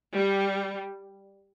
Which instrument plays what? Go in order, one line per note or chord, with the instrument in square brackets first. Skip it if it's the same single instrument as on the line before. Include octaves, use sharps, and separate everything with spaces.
[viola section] G3